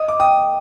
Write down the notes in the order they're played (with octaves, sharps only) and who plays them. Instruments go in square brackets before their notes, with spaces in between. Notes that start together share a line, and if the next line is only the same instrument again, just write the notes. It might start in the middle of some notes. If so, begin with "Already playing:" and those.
Already playing: [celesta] D#5 [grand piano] D#6
[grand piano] D6
[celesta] G5 [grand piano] D#6